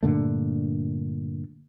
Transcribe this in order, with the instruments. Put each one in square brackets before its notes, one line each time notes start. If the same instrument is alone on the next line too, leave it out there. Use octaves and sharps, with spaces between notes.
[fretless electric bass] G2 A#2 D3 A3